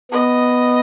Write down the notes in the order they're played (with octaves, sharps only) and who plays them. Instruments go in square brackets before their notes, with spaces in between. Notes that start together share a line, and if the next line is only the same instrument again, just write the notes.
[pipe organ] B3 [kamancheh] D#5